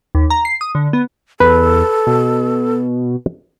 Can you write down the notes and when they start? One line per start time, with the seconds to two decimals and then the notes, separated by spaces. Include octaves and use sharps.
0.15 D#2
0.30 A#5
0.45 C7
0.61 D#6
0.75 D3
0.93 B3
1.40 E2 A4 B4
2.07 B2